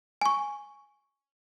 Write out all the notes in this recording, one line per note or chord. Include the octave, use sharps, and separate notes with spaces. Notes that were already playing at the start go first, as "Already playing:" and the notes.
G#5 C#6